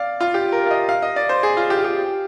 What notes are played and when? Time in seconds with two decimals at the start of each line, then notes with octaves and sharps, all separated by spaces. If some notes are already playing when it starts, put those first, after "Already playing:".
Already playing: D5 F5
0.20 F4
0.34 G4
0.52 A#4
0.66 F5
0.71 D#5
0.89 F5
1.02 D#5
1.16 D5
1.29 C5
1.43 G#4
1.57 F4
1.70 G4
1.79 F4
1.84 G4